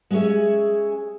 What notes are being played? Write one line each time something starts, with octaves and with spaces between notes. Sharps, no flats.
G#3 C#4 G#4 C#5 E5